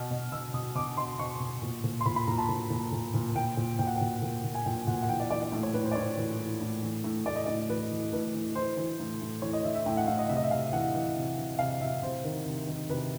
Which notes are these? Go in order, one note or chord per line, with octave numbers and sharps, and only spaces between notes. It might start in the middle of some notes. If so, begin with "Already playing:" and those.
Already playing: B2 F6
B2
B2 E6
B2 D#6
B2 D6
B2 C6
B2 C#6
B2
A#2
A#2
C6
A#2 B5
B5
A#2 A#5
A5
A#2
A#2
A#2
A#2
A#2 G5
A#2
A#2 G5
F#5
G5
A#2
A#2
A#2
G#5
A#2 G5
A#2 F#5
F#5
E3 G5
D5
E3 D5
D5
A2
C#5
A2 B4
C5
D5
A2 C#5
E3
E3
A2
E3
A2
A2 D5
D#5
A2 D5
E3 B4
E3
A2 B4
E3
E3 C5
E3
A2
A2
E3 C#5
D#5
E3 E5
E5
A2 G5
F#5
A2 F5
D#5
C3 E5
D#5
E5
C3 F5
E3 F#5
E3
C3
E3
C3 F5
C3 E5
C3 C5
D#3
C3
D#3
C3 B4